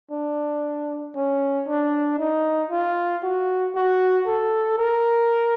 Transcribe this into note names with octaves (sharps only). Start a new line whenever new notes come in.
D4
C#4
D4
D#4
F4
F#4
F#4
A4
A#4